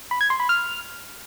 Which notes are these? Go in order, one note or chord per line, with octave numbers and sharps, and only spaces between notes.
B5
G#6
C6
B5
F6